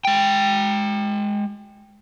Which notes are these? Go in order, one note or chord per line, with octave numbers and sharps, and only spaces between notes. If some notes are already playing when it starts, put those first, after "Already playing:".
G#3 G5